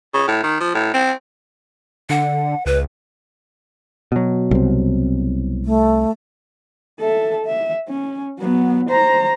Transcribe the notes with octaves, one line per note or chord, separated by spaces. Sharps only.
C#3
A2
D#3
F3
A2
C4
D3 F#5
C#2 B4
B2 F#3
C2 C4
A3
A4 E5
E5
C#4
F#3 B3
C5 A#5